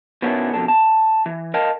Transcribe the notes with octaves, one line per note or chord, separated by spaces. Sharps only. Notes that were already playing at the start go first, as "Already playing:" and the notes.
B2 D#3 B3 C#4 D4 E4
F2 B2 D4 A4
A5
E3
A#4 D#5 F5 G5 A5